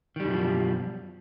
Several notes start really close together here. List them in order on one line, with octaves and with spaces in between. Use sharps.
D#3 G3 F#2 B2 F3